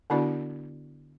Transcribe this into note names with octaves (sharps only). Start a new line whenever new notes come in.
D3 B3 D4 E4 F#4 D5